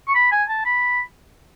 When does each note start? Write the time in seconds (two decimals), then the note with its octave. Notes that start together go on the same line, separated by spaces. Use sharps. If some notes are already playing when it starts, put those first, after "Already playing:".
0.08 C#6
0.15 B5
0.31 G#5
0.49 A5
0.65 B5